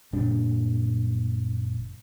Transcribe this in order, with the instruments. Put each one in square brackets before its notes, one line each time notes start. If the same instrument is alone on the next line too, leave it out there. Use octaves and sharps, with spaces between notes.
[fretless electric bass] F#1 A#2 G3 D4